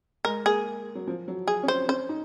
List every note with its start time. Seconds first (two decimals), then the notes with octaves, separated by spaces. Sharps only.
0.25 G#3 A#4
0.46 A#3 G#4
0.95 F#3
1.07 F3
1.28 F#3
1.48 G#4
1.63 C#4
1.68 C4 C5
1.88 C#4 C5
2.09 D#4